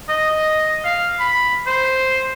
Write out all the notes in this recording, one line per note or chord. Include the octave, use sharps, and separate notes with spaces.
D#5
F5
B5
C5